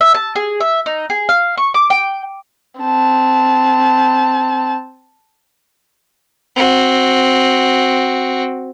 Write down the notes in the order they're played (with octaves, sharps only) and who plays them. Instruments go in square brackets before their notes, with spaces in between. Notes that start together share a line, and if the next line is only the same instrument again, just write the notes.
[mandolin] E5
A5
G#4
E5
D#4
G#4
F5
C#6
D6
G5
[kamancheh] C4 A5
[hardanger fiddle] C4 F#4